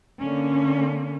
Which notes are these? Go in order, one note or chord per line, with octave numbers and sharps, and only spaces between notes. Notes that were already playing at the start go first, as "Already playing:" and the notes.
D3 A#3 C#4